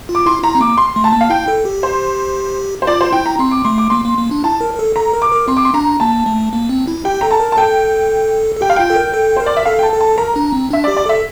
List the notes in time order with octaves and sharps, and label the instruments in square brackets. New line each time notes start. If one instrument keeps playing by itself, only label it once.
[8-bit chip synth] F4
[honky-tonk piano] D6
[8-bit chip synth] E4 [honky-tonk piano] C6
[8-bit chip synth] E4 [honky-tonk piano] A#5
[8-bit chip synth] C4
[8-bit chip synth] A#3 [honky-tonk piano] D6
[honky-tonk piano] C6
[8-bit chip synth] A3
[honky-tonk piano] A5
[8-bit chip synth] A#3
[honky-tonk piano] F5
[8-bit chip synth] E4 [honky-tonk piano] G5
[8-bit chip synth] A4
G4
[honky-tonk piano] C5
C5
[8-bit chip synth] F4 [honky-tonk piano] D5
[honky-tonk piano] C5
[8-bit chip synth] E4 [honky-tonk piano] G5
[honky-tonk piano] A#5
[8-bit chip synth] C4 [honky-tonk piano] C6
[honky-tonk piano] D6
[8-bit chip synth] A3 [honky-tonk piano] C6
[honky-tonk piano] D6
[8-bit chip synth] A#3 [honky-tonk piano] C6
[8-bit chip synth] A#3
A#3
D4
[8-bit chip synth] E4 [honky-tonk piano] A5
[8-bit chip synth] A#4
A#4
A4
[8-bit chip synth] A4 [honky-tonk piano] A#5
[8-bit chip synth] A#4
[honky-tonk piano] D6
[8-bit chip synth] A#4
[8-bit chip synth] C4 [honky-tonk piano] C6
[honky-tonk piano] D6
C6
[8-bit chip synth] D4 [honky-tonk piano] A#5
[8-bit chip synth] A#3 [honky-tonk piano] A5
[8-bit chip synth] A3
A#3
C4
E4
[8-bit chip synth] G4 [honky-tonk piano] G5
[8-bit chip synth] A4 [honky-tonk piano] A#5
[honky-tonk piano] A5
[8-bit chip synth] A#4
[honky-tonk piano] A5
[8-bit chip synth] A4 [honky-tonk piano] G5
[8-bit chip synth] A4
[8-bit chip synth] G4 [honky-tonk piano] G5
[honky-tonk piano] F5
[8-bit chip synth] F4 [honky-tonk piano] G5
[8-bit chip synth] A4
A#4
A4
[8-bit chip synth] A#4 [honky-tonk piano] C5
[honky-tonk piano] D5
E5
[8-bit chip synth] A4 [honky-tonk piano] F5
[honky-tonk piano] G5
A5
[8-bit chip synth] A4
[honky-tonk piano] A5
[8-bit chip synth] A#4 [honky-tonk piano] A#5
[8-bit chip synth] D4
C4
[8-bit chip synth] D4 [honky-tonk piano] E5
[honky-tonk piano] D5
[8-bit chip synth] G4
[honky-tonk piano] D5
[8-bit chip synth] A4 [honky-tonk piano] E5